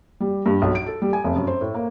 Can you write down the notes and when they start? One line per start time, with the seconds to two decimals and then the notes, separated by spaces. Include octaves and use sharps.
0.20 G3
0.46 G2
0.62 B1
0.75 D7
0.87 A4
1.02 G3
1.13 G#5
1.24 F1
1.36 F#2
1.47 C5
1.61 A2
1.74 A#3